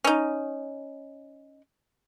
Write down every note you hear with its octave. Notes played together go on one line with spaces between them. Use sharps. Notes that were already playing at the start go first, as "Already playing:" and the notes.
C#4 D#4